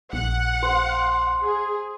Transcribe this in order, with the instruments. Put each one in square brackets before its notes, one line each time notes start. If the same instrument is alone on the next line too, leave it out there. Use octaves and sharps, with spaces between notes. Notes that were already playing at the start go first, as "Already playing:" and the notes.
[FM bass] A#1 [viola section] F#5
[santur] C5
[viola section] G#4